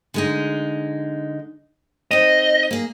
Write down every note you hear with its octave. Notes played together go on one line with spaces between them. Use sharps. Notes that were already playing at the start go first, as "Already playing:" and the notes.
D3 G#3 D#4
C4 D#4 D#5
A#3 G#4